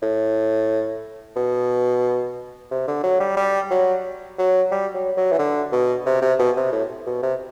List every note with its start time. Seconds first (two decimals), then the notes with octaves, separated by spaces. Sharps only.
0.02 A2
1.36 B2
2.71 C3
2.88 D3
3.04 F#3
3.20 G3
3.37 G3
3.71 F#3
4.39 F#3
4.72 G3
4.95 F#3
5.17 F#3
5.32 E3
5.39 D3
5.73 B2
6.06 C3
6.22 C3
6.39 B2
6.57 C3
6.72 A2
7.07 B2
7.23 C3